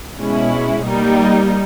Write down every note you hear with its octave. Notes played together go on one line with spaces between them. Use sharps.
B2 G#3 C#4 E4
G3 A#3 D#4